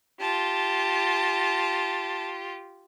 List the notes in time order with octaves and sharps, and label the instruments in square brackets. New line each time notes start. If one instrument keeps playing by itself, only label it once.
[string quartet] F4 G4 [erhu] A5